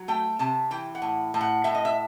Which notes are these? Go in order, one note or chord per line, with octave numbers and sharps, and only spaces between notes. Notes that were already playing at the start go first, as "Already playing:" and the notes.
Already playing: F#3
A3 G5
C3 A5
E3 G5
F#5
A2
A2
F#5
A2 E5
D#5
E5